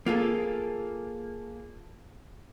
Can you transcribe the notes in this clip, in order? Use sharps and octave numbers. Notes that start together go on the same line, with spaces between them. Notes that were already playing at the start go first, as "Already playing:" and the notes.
A#3 F4 G#4 A4